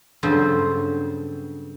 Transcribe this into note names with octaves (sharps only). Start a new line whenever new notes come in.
G2 C#3 F#3 B3 A4 C5